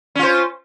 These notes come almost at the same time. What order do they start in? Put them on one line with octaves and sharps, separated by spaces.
C#4 F4 C5